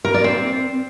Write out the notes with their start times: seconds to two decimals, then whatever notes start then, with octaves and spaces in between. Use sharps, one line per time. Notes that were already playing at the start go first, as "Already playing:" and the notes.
0.05 A#4
0.14 D5
0.24 C4